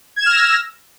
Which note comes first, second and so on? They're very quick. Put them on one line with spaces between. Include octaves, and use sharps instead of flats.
G#6 E7 F6 A#6 E6